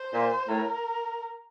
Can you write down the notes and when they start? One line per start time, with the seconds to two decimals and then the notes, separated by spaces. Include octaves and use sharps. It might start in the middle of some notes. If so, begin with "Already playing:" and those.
Already playing: C5
0.13 A#2
0.48 A2 A#4